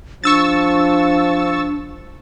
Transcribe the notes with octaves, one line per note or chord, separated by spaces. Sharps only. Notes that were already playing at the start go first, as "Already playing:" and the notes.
F3 D4 C#6 E6 A6